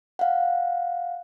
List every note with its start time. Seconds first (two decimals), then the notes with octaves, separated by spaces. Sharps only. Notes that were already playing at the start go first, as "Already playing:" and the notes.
0.19 F5 F#5